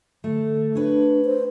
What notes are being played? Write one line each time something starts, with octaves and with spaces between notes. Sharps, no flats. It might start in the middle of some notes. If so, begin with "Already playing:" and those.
D3 A3
D4 B4 C#5
C5